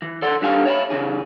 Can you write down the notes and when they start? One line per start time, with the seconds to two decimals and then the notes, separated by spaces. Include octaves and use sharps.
0.02 E3
0.22 A4 D5 F#5 C6
0.41 G2 D4 G4 A4 F5 G#5
0.65 C#5 E5 F#5 B5
0.90 C#3 E3 G#4